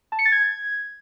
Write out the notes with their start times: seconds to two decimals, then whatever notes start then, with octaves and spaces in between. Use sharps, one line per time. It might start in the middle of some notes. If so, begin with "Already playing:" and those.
0.12 A5
0.19 C#7
0.25 A6
0.32 G#6